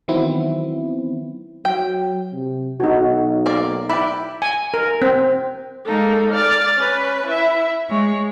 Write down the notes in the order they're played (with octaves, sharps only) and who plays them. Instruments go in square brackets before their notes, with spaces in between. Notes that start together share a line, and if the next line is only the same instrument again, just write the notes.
[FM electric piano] D#3 E3 F#3 B3 C4 E4
[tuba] F#3 [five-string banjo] G5
[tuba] C3
[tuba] B1 [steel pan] D#4 F#4
[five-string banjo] A#3 A#4 D5
[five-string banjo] E4 D5 [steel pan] G5 B5
[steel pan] G#5
A#4
C4
[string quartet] G#3 A#3 D#4 A4
D5 F6 A6
C#4 B4
E4 E5
G#3 C#5